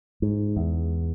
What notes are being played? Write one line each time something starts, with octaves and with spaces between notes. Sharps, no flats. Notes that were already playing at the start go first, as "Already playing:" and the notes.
G#2
E2